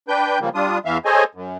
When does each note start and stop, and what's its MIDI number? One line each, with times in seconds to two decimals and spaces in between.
0.08 0.39 62
0.08 0.39 71
0.08 0.39 79
0.08 0.39 91
0.40 0.49 49
0.40 0.49 53
0.40 0.49 55
0.40 0.49 58
0.55 0.78 55
0.55 0.78 62
0.55 0.78 65
0.55 0.78 87
0.85 0.98 40
0.85 0.98 52
0.85 0.98 76
0.85 0.98 77
1.05 1.24 68
1.05 1.24 69
1.05 1.24 72
1.05 1.24 73
1.05 1.24 75
1.05 1.24 80
1.35 1.57 42